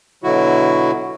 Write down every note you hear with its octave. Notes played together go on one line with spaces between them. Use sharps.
B2 D3 F#3 E4 F#4